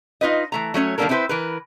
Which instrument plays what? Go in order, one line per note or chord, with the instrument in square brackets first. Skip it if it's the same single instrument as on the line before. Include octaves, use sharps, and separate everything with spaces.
[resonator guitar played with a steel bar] D#4 F4 B4 D#5
E3 A3 A#5
F#3 A3 C#4 C#5
D#3 G3 A#3 D4 A4 A#4
C4 D4 E4 G#4 B4 C5
E3 A#4 B4